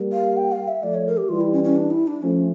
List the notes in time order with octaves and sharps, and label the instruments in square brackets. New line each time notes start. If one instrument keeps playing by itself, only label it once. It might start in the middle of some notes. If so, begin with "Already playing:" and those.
Already playing: [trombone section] G3 A#3
[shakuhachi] F5
G5
F5
E5
[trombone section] F3 A3 [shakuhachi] D5
[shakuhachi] C#5
A#4
G4
[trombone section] E3 G3 [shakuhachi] F4
[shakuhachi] E4
C#4
C#4
D4
E4
D4
[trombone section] F3 A3 [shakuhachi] C#4